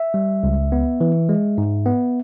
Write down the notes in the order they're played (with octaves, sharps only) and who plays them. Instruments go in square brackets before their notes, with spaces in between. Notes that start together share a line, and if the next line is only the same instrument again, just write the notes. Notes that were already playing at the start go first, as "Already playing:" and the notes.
Already playing: [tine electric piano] E5
G3
C#2
B3
E3
G#3
G#2
B3